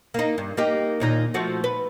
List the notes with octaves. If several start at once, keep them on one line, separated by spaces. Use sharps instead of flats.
A#3 D#4
G2
A#3 D#4 G4
D#2 A#2 D#4
F3 A3 F#4
B4